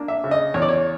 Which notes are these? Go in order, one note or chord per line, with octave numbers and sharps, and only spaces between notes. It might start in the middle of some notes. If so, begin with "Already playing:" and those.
Already playing: A#3 D4
E5
C#3
D#5
E2 C#5
D5
C#5